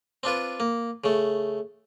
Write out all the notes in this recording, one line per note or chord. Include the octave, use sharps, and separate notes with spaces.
C4 D4 F4 B4
A#3
C#3 A3